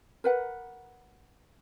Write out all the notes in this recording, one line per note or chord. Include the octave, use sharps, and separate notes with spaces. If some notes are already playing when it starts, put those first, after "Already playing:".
A#4 B4 F#5